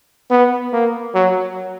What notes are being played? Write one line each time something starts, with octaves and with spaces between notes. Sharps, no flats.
B3
A#3
F#3